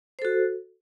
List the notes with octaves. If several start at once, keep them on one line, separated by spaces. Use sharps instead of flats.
F#4 A4 C5